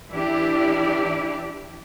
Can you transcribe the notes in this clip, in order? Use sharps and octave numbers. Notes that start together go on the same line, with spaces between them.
E3 D4 E4 G4 D5